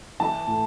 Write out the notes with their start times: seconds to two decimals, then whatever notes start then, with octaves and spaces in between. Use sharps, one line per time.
0.20 E3 A5
0.47 A2